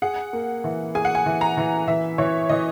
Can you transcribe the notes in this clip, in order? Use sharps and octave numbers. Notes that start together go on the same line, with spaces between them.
G#4 F#5
A#3
E3
G#4 G#5
F#5
G#5
E3
A#5
E3
E3 E5
E3 C#5
E3 D#5